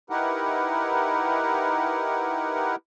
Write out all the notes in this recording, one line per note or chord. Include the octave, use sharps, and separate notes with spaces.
D#4 E4 G4 A#4 B4 F#5